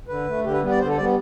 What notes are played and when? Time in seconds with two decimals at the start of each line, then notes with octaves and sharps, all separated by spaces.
0.08 D3 B4
0.27 A3
0.44 D3 G4
0.52 B4
0.62 G3 B3
0.71 D5
0.79 D3 C5
0.89 A4
0.97 G3 B3 D5